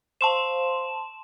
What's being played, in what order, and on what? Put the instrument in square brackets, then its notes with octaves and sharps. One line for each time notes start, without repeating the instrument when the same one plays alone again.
[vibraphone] C5 F5 [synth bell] A5 C6 E7